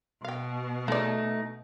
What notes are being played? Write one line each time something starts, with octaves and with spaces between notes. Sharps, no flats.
B2 F5 G5
G#3 A3 D#4 D5